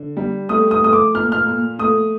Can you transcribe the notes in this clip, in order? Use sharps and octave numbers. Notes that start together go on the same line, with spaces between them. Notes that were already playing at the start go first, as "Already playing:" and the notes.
Already playing: D3
G3
A3 D#6
D#6
A3 D#6
D6
A#2 F6
F6
A#2
A3 D#6